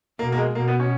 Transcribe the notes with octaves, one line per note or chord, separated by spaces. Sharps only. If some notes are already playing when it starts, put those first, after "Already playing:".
B2 A#3
A#3
G#3
B2 A#3
B3
C#4